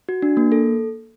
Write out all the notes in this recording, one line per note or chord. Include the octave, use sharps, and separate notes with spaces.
F#4
D4
A#3
A4